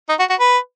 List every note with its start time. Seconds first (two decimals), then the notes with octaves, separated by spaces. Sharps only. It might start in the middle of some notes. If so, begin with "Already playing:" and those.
0.09 D#4
0.19 F#4
0.30 F#4
0.40 B4